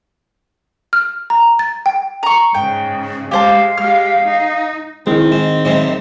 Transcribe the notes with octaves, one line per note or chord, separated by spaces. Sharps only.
F6
A#5
A6
G5
A#5 C#6
G#2 C#3 G5
G#3 G4 C5 F5 A5
G#3 G4 F6
D#4
D#3 G#3 C4 E4
G#2 D#5
B1 G#2 C3